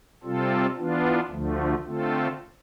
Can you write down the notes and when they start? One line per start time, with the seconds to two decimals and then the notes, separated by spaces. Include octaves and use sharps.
0.24 C3 G3 C4 F4 A4
0.77 E3 B3 D4 F4
1.31 D2 D3 F3 A3
1.85 D3 A3 C4 F4 A4